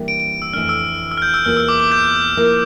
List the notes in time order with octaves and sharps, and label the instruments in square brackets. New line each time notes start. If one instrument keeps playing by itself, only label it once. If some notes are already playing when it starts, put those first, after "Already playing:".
Already playing: [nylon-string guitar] E3 G3 A#3 D4
[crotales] D7
D7
E6
[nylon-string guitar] F2 E3 A3 D4 [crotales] F6
[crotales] E6
E6
F6
G6
E6
[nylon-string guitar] E2 E3 A#3 F4 [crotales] F6
[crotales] E6
D6
D6
G6
[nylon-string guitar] F3 A#3 E4 A#4